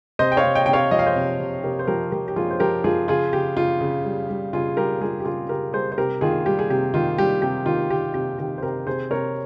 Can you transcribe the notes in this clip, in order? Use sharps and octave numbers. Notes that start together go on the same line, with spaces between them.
C3 C5 D#5
G5
C#5 F5
C3
D#5 G5
C3 G5
C#5 F5
F3 D#5
F5
C5 D#5
C3
C3
C3 G4 A#4
C5
F3 G4 A#4
F3 G4 A#4
G4
F3 F4 G#4
C5
F3 G4 A#4
F3 F4 G#4
C#3 F4 G#4
C#3 G4
C#3 F4
C#3
G3
G3
C#3 F4 G#4
G3 G4 A#4
G3 F4 G#4
G4
C#3 F4 G#4
C#3 G4 A#4
G3 G#4 C5
C5
C3 G4 A#4
D#3 F4 G#4
G3 G4
G#4
C3 G4
D#3 F4
G3 G4
C3 G4
D#3 F4
D#3 G4
C3 G4
D#3 G4
C5
C3 G4 A#4
C3 G#4 C5
C3 A#4 C#5